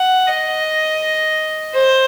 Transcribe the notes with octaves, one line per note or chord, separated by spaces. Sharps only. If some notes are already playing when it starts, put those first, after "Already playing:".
Already playing: F#5
D#5
C5